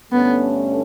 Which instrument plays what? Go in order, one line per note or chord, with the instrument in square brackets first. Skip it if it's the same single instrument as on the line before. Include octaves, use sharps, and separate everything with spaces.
[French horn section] G2 D3 A3 C#4 [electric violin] B3